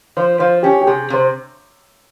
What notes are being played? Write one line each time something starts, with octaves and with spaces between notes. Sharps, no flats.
F3 C5
F3 C5
C#4 G4
G4
C3 G#4
C3 C5